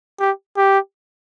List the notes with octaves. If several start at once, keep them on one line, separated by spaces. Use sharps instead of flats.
G4
G4